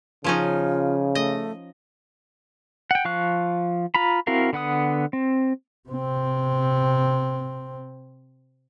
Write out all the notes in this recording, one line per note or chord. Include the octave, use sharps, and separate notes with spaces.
C#3 F3 C#4 D#4 F4
A3 D#5
F#5 G5
F3 F5 C#6 F#6
F4 A#5 B5
C4 E4 F#4 A#4 F5
D3 B3 F#5 D#6
C4
C3 C4